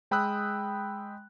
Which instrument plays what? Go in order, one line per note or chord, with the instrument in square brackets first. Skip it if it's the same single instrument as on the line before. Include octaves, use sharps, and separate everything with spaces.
[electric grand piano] G#3 G5 B5 D#6 E6 F#6